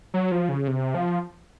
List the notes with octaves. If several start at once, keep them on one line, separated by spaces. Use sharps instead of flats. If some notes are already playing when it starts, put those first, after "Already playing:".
F#3
F3
C#3
C3
F3